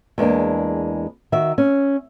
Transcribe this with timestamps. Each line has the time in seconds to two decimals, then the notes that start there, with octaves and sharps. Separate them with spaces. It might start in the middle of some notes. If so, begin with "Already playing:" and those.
0.18 E2 G#3 A#3 D4
1.32 D#3 F#4 E5
1.58 C#4